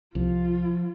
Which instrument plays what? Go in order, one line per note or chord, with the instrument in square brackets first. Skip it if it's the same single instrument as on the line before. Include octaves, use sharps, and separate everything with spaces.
[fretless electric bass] C2 [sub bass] F3 [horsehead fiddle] F4